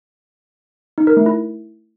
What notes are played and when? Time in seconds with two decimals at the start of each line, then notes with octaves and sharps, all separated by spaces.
0.98 D#4
1.07 A#4
1.17 A3
1.26 E4